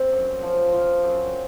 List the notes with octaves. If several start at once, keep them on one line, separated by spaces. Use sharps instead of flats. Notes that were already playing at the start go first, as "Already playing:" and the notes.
Already playing: C4
F#2
F3
F3 F4
F#2